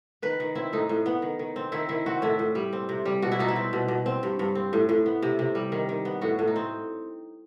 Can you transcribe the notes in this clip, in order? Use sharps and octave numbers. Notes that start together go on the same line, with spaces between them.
D#3 B4
D#3
C4 E4
A2 D#4
A2
B3
D#3
D#3
C4
D#3 E4
D#3 E4
C4 F#4
A2 E4
A2
G3
C4
C3
G3
B2 F#4
E4
B2 D#4
E4
C4
B2
B2
C4
G2
G2
C4
A2
A2
B3
C3
C3
G3
D#3
D#3
B3
A2 F#4
A2
D#4
C4